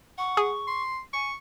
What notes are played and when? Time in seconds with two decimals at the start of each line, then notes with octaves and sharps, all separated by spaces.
0.18 F#5 C#6
0.37 G#4
0.68 C6
1.13 G#5 C#6